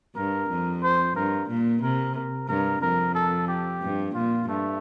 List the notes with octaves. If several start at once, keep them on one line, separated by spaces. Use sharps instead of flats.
G2 A#4
F2
C5
G2 A#4
A#2
C3 A#4
A#4
G2 A#4
F2 A#4
A4
G4
G2
A#2 F4
G2 A3